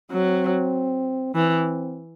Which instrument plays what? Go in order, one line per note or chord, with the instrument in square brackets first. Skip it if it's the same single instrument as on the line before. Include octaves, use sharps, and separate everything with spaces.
[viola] F#3 [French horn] C4
[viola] E3 [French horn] C4